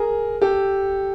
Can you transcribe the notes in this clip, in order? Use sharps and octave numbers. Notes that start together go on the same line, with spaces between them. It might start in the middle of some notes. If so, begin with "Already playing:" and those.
Already playing: G#4 A#4
G4 A4